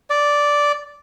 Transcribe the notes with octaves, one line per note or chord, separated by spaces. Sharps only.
D5